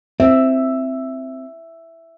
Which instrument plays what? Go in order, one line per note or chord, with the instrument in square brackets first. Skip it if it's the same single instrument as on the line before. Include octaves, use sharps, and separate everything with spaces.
[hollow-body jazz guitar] C4 [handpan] E5